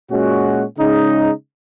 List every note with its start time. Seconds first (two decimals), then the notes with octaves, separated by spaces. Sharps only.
0.11 A#2 G#3 C#4 F#4
0.78 C#3 G#3 D#4